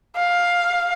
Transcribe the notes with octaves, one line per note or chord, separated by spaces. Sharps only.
F5